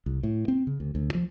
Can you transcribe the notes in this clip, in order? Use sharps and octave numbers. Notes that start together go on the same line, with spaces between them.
C2
A2
C4
C#3
D2
D2
F3